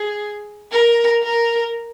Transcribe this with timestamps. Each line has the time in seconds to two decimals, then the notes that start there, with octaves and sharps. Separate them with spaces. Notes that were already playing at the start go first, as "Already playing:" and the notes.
Already playing: G#4
0.72 A#4
1.23 A#4